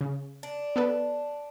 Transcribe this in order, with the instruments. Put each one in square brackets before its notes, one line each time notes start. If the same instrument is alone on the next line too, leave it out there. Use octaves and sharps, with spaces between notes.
[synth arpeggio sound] C#3
[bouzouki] D4
[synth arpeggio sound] B3 A4 B4